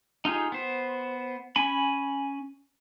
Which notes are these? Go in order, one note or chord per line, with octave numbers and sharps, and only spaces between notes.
D#4 F4 G4 G#4
B3 C5
C#4 G#5 B5